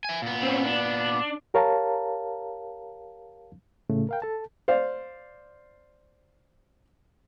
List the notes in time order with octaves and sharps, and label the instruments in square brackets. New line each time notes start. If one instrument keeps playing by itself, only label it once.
[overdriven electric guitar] E5 G#5
A#2 B3
[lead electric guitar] C4 C#4
D4
[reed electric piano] G4 A#4 C#5 F5 A5 A#5
A2 C#3 A3
A#4 F5 G5
A4 A5
[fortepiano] C5 D5 F5